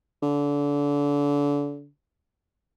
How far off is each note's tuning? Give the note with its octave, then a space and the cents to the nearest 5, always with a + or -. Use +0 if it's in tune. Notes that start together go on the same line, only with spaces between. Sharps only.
D3 -30